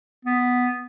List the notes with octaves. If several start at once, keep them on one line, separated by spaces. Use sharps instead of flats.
B3